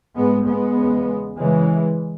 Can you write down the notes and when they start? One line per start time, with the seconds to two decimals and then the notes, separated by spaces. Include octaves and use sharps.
0.15 G#2 G#3 B3
0.46 G#3 B3
0.77 E2 C#3
1.38 F#2 C#3 E3 G#3